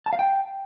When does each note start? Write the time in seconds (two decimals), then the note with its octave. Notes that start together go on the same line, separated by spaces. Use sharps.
0.06 A5
0.13 F5
0.19 G5